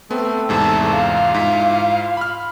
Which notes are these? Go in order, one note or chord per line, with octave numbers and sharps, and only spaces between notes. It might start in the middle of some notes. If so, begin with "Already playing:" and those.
A3 B3 C4
E2 G#2 C3 A5
F4 F5
G#2 E4 B6
B5 F6